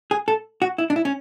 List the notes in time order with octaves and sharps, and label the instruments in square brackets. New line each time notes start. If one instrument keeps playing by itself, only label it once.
[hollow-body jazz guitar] G#4
A4
F#4
E4
D4
E4
C#4